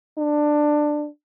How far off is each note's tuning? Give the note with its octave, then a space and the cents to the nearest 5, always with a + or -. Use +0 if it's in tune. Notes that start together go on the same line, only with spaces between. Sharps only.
D4 +15